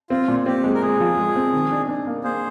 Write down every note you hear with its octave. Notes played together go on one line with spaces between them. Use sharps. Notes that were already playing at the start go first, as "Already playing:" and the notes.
C4 F4
A#2
C4 G4
G#3
A#4
G#3 G#4
F3
G#3
C4
D#3
D4
D4
A#3
A#3 G#4 C5